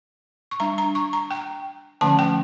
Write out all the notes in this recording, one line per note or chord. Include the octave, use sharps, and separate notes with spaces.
C#6
G3 D4 A#5
A#5
C#6
A#5
G5
D3 F3 A3 C#4 A5
G5